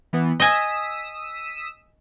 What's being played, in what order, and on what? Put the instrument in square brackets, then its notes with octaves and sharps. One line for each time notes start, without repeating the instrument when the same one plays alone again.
[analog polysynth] E3 B3
[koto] D#5 G#5 [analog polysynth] D#6 E6 B6